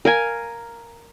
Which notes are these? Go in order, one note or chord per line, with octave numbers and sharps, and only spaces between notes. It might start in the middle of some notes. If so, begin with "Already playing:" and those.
A#4 F5 G#5